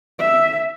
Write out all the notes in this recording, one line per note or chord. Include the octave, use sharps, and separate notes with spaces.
E5